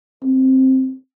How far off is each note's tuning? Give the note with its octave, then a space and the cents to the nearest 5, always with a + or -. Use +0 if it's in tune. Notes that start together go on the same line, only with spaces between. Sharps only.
C4 +5